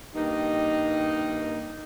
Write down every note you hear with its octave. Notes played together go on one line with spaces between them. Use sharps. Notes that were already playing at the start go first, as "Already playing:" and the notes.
G2 D#3 A#3 D#4